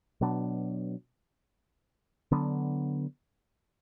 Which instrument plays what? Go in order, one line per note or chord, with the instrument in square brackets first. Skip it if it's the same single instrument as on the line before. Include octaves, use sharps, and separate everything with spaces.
[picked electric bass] B2 F#3 B3 D4
D3 F#3 B3 D4